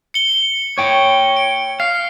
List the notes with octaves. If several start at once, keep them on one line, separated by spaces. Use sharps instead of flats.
C#7 G7
C#5 G5
D7
F5 C7